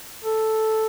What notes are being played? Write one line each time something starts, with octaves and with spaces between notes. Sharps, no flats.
A4